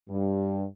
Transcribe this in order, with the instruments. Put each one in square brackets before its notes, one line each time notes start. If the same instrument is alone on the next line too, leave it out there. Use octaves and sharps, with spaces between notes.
[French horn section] G2